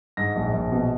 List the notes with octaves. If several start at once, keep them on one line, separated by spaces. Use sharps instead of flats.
G#2 A#6
A#1
A#1
B2